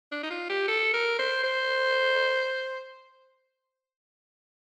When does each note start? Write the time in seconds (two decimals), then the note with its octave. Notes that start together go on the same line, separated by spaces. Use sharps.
0.12 D4
0.23 D#4
0.31 F4
0.50 G4
0.68 A4
0.94 A#4
1.19 C5
1.44 C5